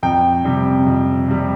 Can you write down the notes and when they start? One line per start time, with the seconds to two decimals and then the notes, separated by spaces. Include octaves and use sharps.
0.03 F2 G5
0.44 C3 G3
0.86 F2
1.28 C3 G3